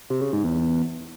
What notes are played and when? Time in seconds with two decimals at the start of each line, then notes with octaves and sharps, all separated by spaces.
0.10 C3
0.22 C#3
0.33 G#2
0.44 E2